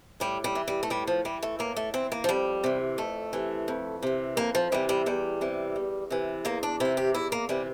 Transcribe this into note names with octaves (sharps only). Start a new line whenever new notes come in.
A2 G3
G3
E3
G3
A3
A2 G3
F3
E3 G3
A3
A2 A#3
A3
E3 C4
A#3
F3
F2 G3
C3 E3
F2 A3
C3 E3
F2
C3 E3
F2 A#3
F3
C3 E3 G3
G3
E2 G3
C3 E3
E2
C3 E3
E2 A#3
D4
C3 E3 E4
G4
E2 E4
A#3
C3 E3 G3